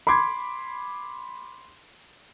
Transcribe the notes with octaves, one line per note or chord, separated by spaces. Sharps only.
B5 C6 D6 G#6